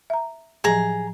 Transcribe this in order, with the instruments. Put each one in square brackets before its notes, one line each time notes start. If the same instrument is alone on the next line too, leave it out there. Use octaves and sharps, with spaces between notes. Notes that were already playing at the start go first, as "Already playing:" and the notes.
[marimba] E5 A#5
[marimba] A2 F3 F#3 [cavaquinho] G#4 A#5